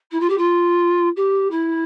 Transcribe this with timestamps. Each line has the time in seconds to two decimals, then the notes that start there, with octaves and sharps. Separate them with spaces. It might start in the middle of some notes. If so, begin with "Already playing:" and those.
0.11 E4
0.20 F4
0.29 G4
0.37 F4
1.16 G4
1.50 E4